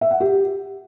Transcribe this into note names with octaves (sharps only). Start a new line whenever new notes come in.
E5
F#5
G4